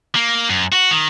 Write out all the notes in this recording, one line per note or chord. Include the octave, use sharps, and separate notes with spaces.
A#3
F#2
F#4
D#3